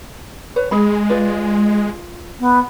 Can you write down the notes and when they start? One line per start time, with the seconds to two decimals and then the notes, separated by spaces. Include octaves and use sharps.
0.56 B4 C#5
0.71 G#3 G#4 B5
1.09 F4 B4 D5
2.40 B3